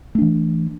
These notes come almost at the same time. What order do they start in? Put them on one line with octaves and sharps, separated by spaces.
A3 D4 E3